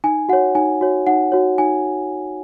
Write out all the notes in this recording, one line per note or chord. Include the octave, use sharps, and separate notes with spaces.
D#4 G#5
F#4 C#5 F#5
D#4 G#5
F#4 C#5
D#4 F#5
F#4 C#5
D#4 G#5